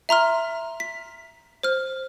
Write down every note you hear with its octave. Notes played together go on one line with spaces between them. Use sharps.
E5 A#5 C6 F6
B6
C5 F6